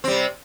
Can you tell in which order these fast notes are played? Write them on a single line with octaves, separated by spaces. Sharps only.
C4 G3 C3